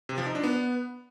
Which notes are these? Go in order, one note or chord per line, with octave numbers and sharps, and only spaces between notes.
C3
F3
D#4
D4
B3